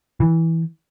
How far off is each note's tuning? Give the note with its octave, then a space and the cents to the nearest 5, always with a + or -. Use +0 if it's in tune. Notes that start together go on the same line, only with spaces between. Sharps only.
E3 -10